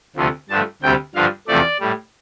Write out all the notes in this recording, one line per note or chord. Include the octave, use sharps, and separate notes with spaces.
D2 C3 F3 A3
G2 D3 F3 A3 A5
D2 C3 G3 G5
G2 D3 F3 F5
E2 C3 F3 A3 D5
A2 G3